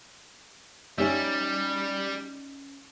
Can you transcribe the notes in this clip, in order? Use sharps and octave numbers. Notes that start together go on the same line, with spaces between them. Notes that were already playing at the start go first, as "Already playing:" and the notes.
G3 C#4 D#4 G4 E5